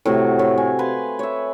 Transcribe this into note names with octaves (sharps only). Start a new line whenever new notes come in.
A2 C3 F#4 A#5
A2
G#5
B4 F5 G#5 C6
C#5 E5